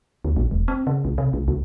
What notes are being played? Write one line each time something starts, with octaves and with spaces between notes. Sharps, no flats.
D2
A#1
E1
C4
C#3
C2
C3
C2
C#2